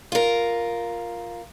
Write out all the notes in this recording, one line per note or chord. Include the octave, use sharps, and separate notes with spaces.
F4 A#4